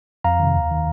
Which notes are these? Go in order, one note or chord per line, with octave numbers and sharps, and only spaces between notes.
F2 F5 A#5
C3 D#3
D#2
D#3